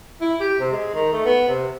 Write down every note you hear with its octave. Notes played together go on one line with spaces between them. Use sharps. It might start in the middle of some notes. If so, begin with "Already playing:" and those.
E4
G4
C3
G#3
D#3
A3
B3
C3